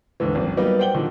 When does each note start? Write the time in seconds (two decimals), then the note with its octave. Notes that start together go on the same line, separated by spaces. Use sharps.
0.20 D#2 G#2 D3 E3
0.35 G#1 F#2
0.57 F#3 G3 A#3 B3 D#4 G4
0.79 C5 F#5 G5 F#7 G7
0.94 A#2 D3 D#3 F#3